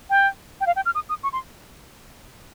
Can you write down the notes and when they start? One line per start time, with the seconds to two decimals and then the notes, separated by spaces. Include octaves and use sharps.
0.10 G5
0.61 G5
0.67 F5
0.76 G5
0.86 F6
0.95 D#6
1.09 D#6
1.23 C#6
1.33 C6